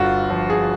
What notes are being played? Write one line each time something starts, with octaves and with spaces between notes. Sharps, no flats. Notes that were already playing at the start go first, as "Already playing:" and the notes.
Already playing: G1 D3 F4 F#4
F3
G#4